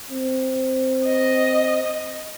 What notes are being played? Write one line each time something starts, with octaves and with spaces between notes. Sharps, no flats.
C4
D#5